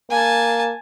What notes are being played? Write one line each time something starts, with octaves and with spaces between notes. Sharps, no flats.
A#3 G#5 A5